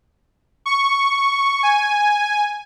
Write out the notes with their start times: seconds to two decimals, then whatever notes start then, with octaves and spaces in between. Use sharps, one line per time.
0.66 C#6
1.63 G#5